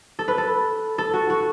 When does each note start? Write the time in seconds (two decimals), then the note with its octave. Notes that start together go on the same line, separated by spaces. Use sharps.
0.19 A4
0.28 B4
0.38 A4
0.98 A4
1.13 F#4
1.30 F#4